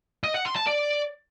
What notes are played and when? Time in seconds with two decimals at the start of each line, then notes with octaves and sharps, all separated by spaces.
0.24 D#5
0.35 F#5
0.45 C6
0.56 A5
0.67 D5